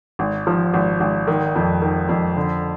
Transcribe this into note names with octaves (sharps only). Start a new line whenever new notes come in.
G#1
F3
G#1
G#1
D#3
F2
D#3
F2
D3